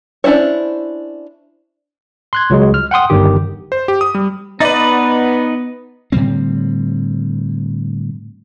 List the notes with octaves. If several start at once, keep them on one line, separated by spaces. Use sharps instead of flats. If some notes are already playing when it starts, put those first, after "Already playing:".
C#4 D4 E4 C5 C#5
C6 F#6 G#6
C#2 F#3 G#3
F6
F#5 G5 C6 D#6
G1 G2 D#3 G4
C5
G4
D#6
G3
B3 D#4 B4 D5 D#5 A6
A2 D3 G3 C4